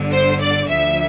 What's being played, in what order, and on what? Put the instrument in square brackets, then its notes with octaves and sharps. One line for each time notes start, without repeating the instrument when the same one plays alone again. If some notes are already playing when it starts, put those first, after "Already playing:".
Already playing: [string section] G1 G2 D3
C5
D5
D2 D3 F3 E5